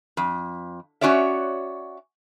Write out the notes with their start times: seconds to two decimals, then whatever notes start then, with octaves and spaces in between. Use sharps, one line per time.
0.17 F2
1.01 C#4 F#4 C#5 D5 E5